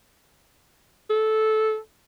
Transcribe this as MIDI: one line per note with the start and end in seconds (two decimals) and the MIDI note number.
1.10 1.77 69